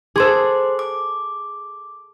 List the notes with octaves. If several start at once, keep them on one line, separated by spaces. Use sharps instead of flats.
G#4 A4 C5 C6 D6
D6